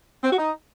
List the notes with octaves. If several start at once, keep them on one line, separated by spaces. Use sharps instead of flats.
C4
F#4
D#4